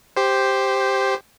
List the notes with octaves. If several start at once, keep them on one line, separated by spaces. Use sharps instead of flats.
G4 C5